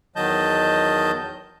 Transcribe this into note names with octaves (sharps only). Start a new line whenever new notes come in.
E2 D#3 F#3 D#5 A5 G6